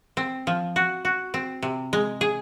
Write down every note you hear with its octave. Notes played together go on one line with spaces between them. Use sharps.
C4
F3
F#4
F#4
C4
C3
G#3
G#4